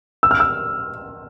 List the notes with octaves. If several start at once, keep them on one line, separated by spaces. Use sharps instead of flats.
E6
F6
E6